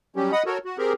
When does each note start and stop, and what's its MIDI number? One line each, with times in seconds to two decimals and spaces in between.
0.16 0.32 54
0.16 0.32 55
0.16 0.32 61
0.16 0.32 67
0.32 0.43 75
0.32 0.43 78
0.32 0.43 83
0.32 0.43 87
0.46 0.58 66
0.46 0.58 69
0.46 0.58 70
0.46 0.58 73
0.65 0.78 66
0.78 0.93 60
0.78 0.93 67
0.78 0.93 68
0.78 0.93 70